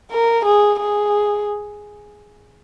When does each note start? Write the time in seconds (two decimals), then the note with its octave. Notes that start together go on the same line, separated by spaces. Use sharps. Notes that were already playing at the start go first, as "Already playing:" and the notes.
0.11 A#4
0.46 G#4
0.80 G#4